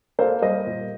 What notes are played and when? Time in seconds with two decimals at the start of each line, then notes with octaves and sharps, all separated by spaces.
0.19 A#3 A4 C5
0.42 G3 C5 D#5
0.66 A#2